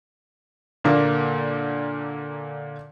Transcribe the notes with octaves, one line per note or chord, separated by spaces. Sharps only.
A#2 D3 A#3